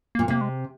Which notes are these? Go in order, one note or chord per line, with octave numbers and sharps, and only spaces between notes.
A#3
A#2
C3 A#3
G#3